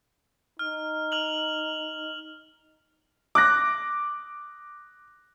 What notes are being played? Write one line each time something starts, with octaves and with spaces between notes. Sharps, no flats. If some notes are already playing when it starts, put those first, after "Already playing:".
D#4 F6
F6 F7 F#7
D6 F#6 A#6